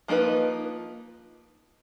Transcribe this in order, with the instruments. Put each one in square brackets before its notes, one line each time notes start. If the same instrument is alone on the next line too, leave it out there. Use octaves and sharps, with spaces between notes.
[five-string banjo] F3 A#3 D#4 G#4 B4